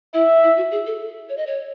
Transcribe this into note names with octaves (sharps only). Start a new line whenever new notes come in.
E4 E5
E4
F#4
G#4
A4
C#5
D#5
C#5